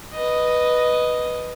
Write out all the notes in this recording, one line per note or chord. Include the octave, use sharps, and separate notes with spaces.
B4 D#5